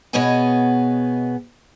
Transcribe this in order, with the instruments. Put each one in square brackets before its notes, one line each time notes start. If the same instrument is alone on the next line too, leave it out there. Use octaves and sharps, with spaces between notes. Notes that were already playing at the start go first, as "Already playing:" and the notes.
[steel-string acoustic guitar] B2 B3 G#4 C#5 D#5 G#5